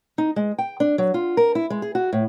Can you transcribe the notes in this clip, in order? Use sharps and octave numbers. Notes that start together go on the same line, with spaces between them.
D#4
G#3
G5
D4
F#3
F4
A#4
E4
G#3
G#4
F#4
A2